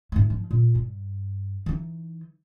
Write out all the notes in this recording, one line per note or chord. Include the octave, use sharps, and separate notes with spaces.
G#2 A3
F3
A#2
G2
E3 D#4